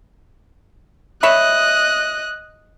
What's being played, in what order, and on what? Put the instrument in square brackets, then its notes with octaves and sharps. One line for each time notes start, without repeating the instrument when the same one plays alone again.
[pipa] C#5 E5 B5 [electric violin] D#5 F#6